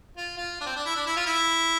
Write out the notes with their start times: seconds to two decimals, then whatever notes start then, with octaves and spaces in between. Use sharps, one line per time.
0.17 F4
0.37 F4
0.61 D4
0.66 C4
0.76 D4
0.86 E4
0.96 D4
1.07 E4
1.16 F4
1.26 E4